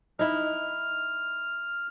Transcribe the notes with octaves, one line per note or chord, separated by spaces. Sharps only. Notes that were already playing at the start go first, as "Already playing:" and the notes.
D#4 E4 F6